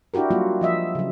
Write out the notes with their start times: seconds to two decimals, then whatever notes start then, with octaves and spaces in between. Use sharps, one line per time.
0.14 D4 E4 F#4 G4 A#4
0.30 F#3 G3 A#3 F4 F#4
0.61 F3 D#5 E5
0.95 C#3 F#3